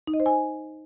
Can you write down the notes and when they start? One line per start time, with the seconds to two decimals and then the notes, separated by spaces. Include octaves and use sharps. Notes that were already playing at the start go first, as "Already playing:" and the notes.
0.07 D#4
0.14 D#5
0.20 C5
0.26 G#5